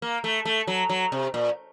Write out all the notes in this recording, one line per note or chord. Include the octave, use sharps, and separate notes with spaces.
A#3
A3
A3
F#3
F#3
C3
A#2